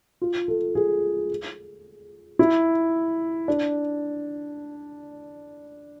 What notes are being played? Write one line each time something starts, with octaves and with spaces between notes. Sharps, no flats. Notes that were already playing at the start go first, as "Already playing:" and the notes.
F4
A4
G#4
E4
D4